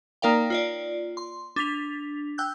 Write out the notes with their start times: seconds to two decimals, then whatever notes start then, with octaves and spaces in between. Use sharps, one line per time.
0.22 A#3 D#4 A#4 D5 F5 G5
0.50 F4 C#5 D5
1.17 C6
1.56 D4 A6 B6 F7
2.38 G5 E6 F#6 G6